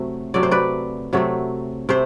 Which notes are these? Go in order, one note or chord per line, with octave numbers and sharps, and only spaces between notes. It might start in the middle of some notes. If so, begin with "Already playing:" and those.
Already playing: C3 F#3 A3 C4
C3 F#3 A3 C4 D5
C5
B4 D5
C3 F#3 A3 C4
C3 A3 C4 C5